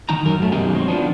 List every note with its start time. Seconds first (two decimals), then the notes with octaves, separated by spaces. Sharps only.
0.09 D#3 D#4 A#5
0.25 F#2 A#4
0.39 F#2 A3
0.52 F#2 B2 D#3 G#3 G4
0.73 F#3 C4
0.88 D#3 F3 B3 D4